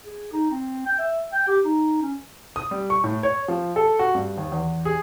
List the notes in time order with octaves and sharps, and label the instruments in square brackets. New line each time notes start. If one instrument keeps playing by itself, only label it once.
[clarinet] G#4
D#4
C4
G5
E5
G5
G4
D#4
C#4
[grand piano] D#6
G3
C#6
A2
C#5
F3
A4
F#4
G2
D#2
E2
G#4